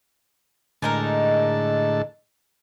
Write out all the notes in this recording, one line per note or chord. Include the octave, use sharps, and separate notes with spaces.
A2 D3 G#3 D#4 A#4 A5